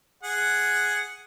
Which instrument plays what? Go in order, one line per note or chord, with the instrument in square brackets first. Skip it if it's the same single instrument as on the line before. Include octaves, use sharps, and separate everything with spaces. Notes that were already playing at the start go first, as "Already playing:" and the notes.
[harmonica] G#4 F#5